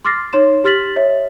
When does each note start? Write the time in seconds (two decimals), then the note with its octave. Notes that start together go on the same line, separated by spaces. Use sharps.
0.05 C6 D6 F6 A6 A#6 C7
0.33 D#4 C#5 C6 E7
0.64 G4 C6 F6 A6 B6 F#7
0.96 C#5 D#5 E5